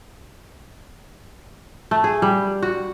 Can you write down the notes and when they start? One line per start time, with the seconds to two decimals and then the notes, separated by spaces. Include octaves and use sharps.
1.91 A3
2.04 G#4
2.22 G3
2.62 F#4